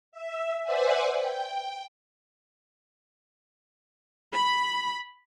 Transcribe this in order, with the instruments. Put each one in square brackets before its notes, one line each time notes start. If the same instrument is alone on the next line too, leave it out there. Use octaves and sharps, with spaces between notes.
[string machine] E5
B4 C5 D5 E5 F#5 G#5
G5
[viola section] B5